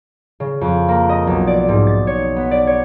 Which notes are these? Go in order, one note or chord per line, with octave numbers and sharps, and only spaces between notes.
C#3
F2
A#3
D#5
B1
D5
G#2
A6
C#5
B3
D5
C#5